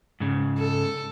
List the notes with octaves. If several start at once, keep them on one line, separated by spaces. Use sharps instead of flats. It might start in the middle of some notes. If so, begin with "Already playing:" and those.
G#2 C#3
A4